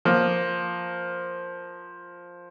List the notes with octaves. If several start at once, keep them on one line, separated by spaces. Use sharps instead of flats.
F3 A#3